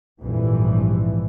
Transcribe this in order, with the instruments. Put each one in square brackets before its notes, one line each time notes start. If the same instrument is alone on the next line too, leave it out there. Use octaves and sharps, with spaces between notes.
[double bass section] A#1 F2 G#2 E3 G3